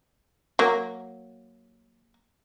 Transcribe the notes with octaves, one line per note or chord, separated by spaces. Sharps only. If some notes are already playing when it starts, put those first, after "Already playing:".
F#3 A#3